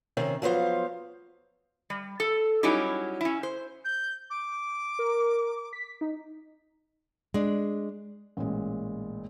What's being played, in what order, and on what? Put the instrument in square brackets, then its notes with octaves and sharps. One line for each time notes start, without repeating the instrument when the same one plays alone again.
[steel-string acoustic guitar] C3 D#3 C4 C#4
F3 F#3 B3 C5 F5
[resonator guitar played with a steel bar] G3
A4
F#3 G3 C#4 D#4 E4 G4
C#4 E4
C5
[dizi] G6
D6
[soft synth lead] A#4
B6
D#4
[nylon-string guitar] G#3 D4
[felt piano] A1 A#2 G#3